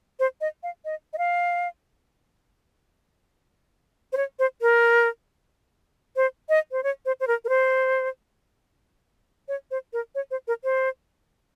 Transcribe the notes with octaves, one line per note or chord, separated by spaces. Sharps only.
C5
D#5
F5
D#5
D#5
F5
C5
C#5
C5
A#4
C5
D#5
C5
C#5
C5
C5
A#4
A#4
C5
C#5
C5
A#4
C#5
C5
A#4
C5